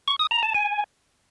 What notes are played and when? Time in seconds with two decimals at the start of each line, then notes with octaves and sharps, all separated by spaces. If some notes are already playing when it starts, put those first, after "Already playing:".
0.08 C#6
0.19 D#6
0.31 A#5
0.43 A5
0.54 G#5